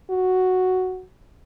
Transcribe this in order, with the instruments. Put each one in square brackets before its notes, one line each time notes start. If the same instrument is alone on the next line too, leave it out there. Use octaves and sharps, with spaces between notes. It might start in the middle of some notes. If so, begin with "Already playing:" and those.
[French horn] F#4